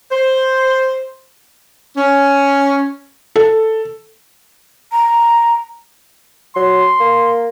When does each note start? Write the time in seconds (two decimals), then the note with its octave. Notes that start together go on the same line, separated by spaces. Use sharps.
0.12 C5
1.96 C#4
3.36 A4
4.92 A#5
6.56 F#3 C6
7.00 A#3